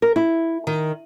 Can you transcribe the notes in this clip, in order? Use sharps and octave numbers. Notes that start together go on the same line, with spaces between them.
A#4
E4
D#3